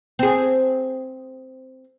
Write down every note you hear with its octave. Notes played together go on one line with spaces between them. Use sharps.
C4 G#4